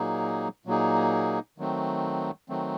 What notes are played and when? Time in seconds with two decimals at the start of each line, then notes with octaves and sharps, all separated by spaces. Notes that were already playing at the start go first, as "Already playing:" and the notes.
Already playing: A#2 F#3 A#3 D#4 G#4
0.65 A#2 F#3 A#3 D#4 G#4
1.58 D#3 F#3 A3 C4
2.49 D#3 F#3 A3 C4